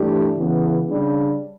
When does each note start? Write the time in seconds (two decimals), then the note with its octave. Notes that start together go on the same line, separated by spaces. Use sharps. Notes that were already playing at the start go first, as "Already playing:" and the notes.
Already playing: G2 E3 A3 D4 G4
0.36 C#3 E3 B3
0.88 C#3 G3 D4